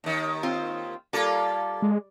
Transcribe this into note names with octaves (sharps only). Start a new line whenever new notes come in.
D#2 D#3
C4 F4
G3 A#3 F4 A4
G#3